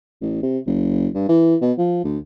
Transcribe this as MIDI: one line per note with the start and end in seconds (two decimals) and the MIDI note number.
0.22 0.42 33
0.42 0.58 48
0.66 1.08 30
1.15 1.28 43
1.29 1.56 52
1.61 1.72 47
1.78 2.01 53
2.04 2.18 38